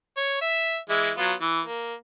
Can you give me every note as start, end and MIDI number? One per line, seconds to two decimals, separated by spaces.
0.17 0.40 73
0.41 0.77 76
0.89 1.11 52
0.89 1.11 56
0.89 1.11 64
1.17 1.33 54
1.17 1.33 59
1.17 1.33 65
1.41 1.61 52
1.65 1.94 58